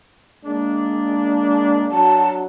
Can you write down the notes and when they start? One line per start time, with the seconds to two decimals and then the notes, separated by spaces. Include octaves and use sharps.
0.45 G#3 A#3 D4
1.91 F#3 D4 F#4 A5